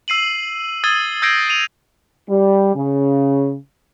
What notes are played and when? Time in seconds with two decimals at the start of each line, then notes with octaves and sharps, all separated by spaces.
0.08 E6 C7 D#7 F#7
0.84 D#6 E6 G#6 A6 D#7 G7
1.22 E6 G6 G#6 A#6 C7 D7
1.49 D#7 F7
2.29 G3
2.75 C#3